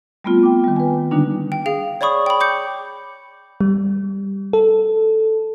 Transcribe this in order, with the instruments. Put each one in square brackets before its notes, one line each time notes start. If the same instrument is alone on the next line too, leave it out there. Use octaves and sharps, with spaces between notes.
[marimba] G3 A3 B3 C4 F4
G5 D6
D#3 G3
B4 G#5
D3 G3 A#3 D4 D#4
[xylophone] G5
G#4 F5 G5
C#5 D5 B5 C#6 D#6
G5 B5
D6 G6 C#7
[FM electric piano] G3
A4